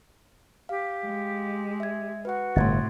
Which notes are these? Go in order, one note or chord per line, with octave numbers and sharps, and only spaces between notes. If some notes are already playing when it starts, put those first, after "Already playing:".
G4 F5
G#3
E5 G#6
F#4 B4 F#5
G1 A2 C3 C6 G#6 A6